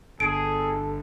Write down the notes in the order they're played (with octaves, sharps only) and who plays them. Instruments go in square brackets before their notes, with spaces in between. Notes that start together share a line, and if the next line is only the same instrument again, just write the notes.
[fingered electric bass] G1 [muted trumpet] G#4 [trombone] A4 [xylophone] D7